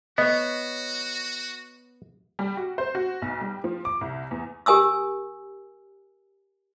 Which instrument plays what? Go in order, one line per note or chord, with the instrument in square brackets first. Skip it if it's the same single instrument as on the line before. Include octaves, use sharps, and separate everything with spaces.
[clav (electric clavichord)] B3 [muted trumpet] F#4 [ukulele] C#5 D#5
[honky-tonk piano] G3
F#4
C5
F#4
B1
G3
F3
D6
C2
E2
[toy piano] G4 A#4 G#5 D#6 E6